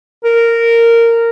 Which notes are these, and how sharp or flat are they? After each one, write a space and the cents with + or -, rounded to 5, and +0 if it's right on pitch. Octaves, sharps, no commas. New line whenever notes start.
A#4 -10